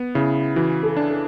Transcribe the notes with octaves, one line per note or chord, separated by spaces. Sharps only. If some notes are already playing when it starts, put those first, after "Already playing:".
Already playing: B3
C#3 E4
E3 F#4
A4
D4
A4